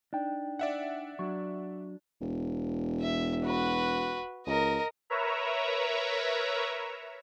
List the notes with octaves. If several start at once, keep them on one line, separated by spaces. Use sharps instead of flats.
D4 D#4 G5
D5 E5 F#5
F#3 D4 C#6
E1
E5
F#4 B4
C#2 A#4 D#5
A#4 B4 C#5 E5 A#5